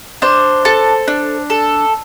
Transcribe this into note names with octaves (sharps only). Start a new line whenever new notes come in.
D4 C5
A4
D4
A4